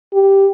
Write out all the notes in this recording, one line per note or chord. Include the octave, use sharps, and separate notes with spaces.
G4